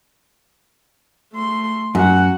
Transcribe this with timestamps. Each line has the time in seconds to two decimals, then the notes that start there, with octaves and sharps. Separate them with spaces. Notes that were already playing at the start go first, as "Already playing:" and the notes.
1.34 A3 C6
1.95 F#2 F#4 F#5